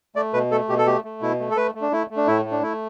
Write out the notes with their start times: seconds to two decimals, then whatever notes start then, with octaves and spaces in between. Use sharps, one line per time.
0.16 A3 D5
0.34 B2 B4
0.51 A3 A4
0.69 B2 G4
0.78 A4
0.86 A3 G4
1.04 A3
1.22 B2 E4
1.39 A3
1.51 A4
1.57 A3 B4
1.75 A3
1.81 D4
1.92 A3 E4
2.10 A3
2.17 D4
2.27 A2 E4
2.45 A3
2.51 D4
2.62 A3 E4